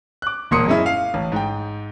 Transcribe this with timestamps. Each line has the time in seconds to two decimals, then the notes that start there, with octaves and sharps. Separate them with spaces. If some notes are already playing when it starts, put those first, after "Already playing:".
0.22 D6 F#6
0.51 E1 A#2 A#3 C6 D#6 C#7
0.66 F#2 G#3 C#4 E4
0.86 F5
1.14 A1
1.32 G#2 G5